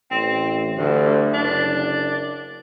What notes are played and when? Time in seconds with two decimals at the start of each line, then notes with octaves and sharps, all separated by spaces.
0.11 A1 C4
0.78 D2 G2
1.34 F#1 D4